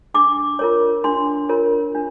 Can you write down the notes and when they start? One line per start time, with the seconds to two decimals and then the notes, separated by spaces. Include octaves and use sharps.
0.14 D4 D6
0.59 F4 A#4 C#5
1.04 D4 C6
1.49 F4 A#4 C#5
1.95 D4